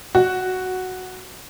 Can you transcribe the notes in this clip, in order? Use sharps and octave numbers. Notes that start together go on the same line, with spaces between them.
F#4